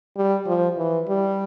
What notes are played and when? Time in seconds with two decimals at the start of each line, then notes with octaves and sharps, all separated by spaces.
0.17 G3
0.47 F3
0.77 E3
1.08 G3